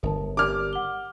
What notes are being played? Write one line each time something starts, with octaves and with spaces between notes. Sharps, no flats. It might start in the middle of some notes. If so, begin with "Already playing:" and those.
G1 A#4 A5
G4 A#4 D5 D6 F6
F#5 G7